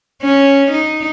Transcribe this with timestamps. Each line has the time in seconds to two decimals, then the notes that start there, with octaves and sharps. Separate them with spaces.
0.22 C#4
0.71 D#4